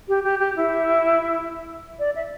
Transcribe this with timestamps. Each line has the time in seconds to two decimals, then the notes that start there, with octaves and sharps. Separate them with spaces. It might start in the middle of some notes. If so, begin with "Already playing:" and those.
0.08 G4
0.24 G4
0.40 G4
0.56 E4
1.99 D5
2.16 E5